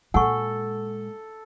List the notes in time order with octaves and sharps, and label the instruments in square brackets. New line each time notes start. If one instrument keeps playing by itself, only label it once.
[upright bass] A#2 G#3 [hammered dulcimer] A4 [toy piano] F#5 C#6